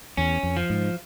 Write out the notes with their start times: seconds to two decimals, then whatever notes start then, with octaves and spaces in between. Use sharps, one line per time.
0.17 E2 C#4
0.43 F2
0.57 F3
0.70 G#2